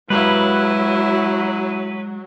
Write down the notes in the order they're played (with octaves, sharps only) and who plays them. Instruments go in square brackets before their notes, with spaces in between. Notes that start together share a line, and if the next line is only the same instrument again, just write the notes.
[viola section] F#3 [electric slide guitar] G#3 G4 F5 [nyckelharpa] E4 [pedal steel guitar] B4